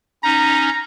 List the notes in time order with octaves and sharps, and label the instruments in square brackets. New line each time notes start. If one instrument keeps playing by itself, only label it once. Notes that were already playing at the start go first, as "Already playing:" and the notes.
[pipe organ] C#4 D#4 [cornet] A#5